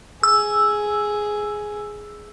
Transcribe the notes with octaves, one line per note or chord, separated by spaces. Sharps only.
G#4 E6